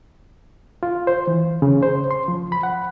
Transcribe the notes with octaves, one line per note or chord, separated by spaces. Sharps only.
F4
C5
E3
C#3
C5
C6
F3
B5
F#5